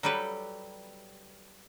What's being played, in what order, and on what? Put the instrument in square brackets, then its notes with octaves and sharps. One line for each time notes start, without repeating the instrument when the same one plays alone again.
[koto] F#3 G3 G4 A4 B4